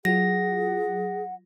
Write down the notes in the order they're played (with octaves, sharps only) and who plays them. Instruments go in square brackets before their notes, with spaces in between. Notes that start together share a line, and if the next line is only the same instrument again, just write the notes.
[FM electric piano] F#3 F4 [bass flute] G#4 [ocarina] F#5 [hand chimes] A#6